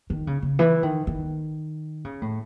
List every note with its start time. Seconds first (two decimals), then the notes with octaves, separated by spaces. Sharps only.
0.10 D#3
0.27 C#3
0.42 C#3
0.59 E3
0.83 D#3
1.07 D#3
2.05 C#3
2.22 A2